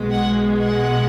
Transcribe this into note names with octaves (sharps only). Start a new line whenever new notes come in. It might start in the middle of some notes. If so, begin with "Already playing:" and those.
Already playing: B1 B2 G#3
F#5
F#5